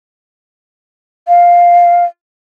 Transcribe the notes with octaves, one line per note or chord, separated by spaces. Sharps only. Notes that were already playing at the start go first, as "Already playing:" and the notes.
F5